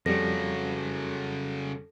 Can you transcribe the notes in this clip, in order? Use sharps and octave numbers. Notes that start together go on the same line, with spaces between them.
F2 C#3 F#3 G3 A4 A#6